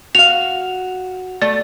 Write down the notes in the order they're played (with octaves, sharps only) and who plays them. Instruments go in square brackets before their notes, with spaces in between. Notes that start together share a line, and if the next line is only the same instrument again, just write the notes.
[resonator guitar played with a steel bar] F#4 F5 [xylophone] F7
[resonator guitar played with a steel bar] A3 [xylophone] D5